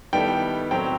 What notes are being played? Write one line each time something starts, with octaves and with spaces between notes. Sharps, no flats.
D#3 G3 B3 E4 A4 G5
A2 F#3 C4 G5